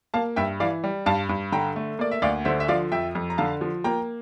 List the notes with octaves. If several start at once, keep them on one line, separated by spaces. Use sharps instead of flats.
A#3 F5 A5
G2 E5 G5
E3 D5 F5
G3
G2 F5 A5
G2
D3 G5 A#5
A3
A#3 D5
E5
D2 D5 F5
D3 C5 E5
E5
F3 D5 F5
F2 E5 G5
F2
A#5
D3 F5 A5
F3
A#3 G5 A#5